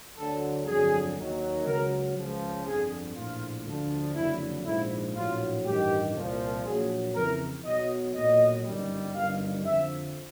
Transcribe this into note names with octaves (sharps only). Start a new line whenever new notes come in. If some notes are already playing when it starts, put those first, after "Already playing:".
D2 D3 F#3 A4
G1 F2 D3 F#3 G#4
D#2 D#3 F#3
C#2 C#3 F#3 A#4
C#2 C#3 F3
G1 F2 D3 G#4
A#1 A2 F3 F4
D2 D3 F3
F#1 F2 D3 F#3 E4
A#1 G#2 F3 E4
A#1 A2 F#3 F4
A1 G2 D#3 G4
C2 A#2 F3
A#1 A#2 F#3 G#4
F2 C#3 E3 A#4
B1 B2 F#3 D#5
B1 A#2 F#3 D#5
G1 F#2 D#3 G3
G1 F#2 D#3 G3 F5
F2 D3 F3 E5